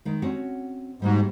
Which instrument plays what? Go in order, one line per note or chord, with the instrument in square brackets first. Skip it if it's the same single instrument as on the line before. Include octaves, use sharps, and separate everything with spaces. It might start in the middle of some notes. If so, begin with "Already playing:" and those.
[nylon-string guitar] D#3 G#3
C4 C#4 F#4
[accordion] G#2 [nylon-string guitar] G3 A#3 F#4